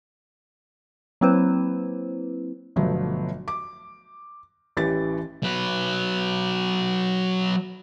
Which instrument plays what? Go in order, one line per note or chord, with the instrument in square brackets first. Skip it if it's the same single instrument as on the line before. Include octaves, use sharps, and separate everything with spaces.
[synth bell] F#3 A#3 C4 E4 B4 C5
[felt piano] G1 B2 F3 F#3 A3
D6
A1 E3 G4 A6
[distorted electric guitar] F#3 B4